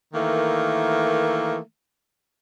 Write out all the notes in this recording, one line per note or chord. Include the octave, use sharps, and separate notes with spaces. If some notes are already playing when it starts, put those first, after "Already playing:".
D#3 E3 A3 A#3